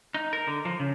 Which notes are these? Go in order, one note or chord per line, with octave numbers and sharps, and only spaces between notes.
D#4
A#4
D3
F3
C#3